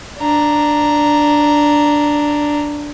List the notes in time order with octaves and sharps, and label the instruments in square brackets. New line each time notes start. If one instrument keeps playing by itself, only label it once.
[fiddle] D4 A#5